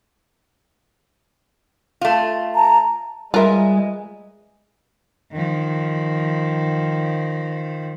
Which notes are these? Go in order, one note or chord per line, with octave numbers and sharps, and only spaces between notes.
A3 F4
A5 A#5
G3 G#3 F4 A#4 B4 E5
D#3 F3